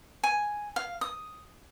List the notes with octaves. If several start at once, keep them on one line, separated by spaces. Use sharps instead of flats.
G#5
F5
D#6